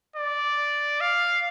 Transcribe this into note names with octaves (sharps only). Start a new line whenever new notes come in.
D5
F5